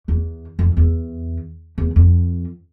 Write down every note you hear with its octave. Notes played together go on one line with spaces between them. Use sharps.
E2
F2
E2
E2
F2